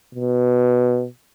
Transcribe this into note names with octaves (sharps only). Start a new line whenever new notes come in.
B2